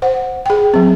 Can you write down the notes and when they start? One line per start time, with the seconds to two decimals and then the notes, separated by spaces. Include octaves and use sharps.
0.02 C5 F#5
0.46 G#4 G5
0.74 F#3 C4